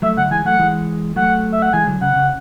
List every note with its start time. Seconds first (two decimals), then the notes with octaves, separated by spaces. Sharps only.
0.02 F#3 A3 E5
0.17 D3 F#3 F#5
0.31 E3 G#3 G#5
0.45 F#3 A3 F#5
0.59 E3 G#3
1.16 F#3 A3 F#5
1.52 E5
1.62 F#5
1.73 E3 G#3 G#5
1.87 D3 F#3
2.01 C#3 F#5
2.16 C#3